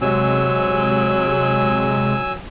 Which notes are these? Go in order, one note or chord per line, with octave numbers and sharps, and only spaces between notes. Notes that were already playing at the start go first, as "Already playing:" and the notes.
C3 F#3 G#3 G#5 E6